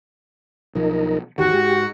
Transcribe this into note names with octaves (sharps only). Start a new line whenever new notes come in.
B1 F3 D#4 A#4
G#1 E2 D#3 F#4 G4
G#2